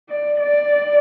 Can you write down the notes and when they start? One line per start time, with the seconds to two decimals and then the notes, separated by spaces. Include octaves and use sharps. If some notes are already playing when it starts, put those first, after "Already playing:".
0.10 D5
0.40 D5